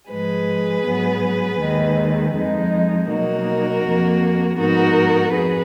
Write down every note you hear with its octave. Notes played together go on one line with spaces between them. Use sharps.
G#2 F3 G#3 G#4 B4
G#2 F#3 B3
D#2 D#3 G#3
F2 F3 G#3 D#4
B2 F#3 A#3 D#4 F#4 A#4
F2 F3 A#3
G#2 F3 B3 D#4 F#4 A#4
F2 G#4 B4